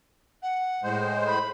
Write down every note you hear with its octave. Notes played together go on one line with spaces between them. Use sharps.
F#5
A2 G#3 C5
B5